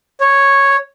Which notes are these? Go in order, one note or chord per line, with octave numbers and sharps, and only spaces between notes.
C#5